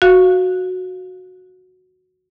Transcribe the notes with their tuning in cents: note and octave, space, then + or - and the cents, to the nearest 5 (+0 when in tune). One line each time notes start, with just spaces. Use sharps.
F#4 -5 F5 +0